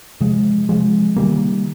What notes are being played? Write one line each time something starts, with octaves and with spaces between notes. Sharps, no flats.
C3 F3 G#3
C3 F3 G#3
D#3 G3 A#3